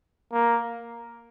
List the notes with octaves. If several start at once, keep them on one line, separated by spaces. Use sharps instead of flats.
A#3